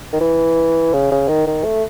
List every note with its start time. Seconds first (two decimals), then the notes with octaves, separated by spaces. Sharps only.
0.13 D#3
0.21 E3
0.93 C#3
1.11 C#3
1.28 D#3
1.47 D#3
1.65 A3